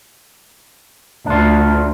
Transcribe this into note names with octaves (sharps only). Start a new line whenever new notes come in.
D2 D4 F4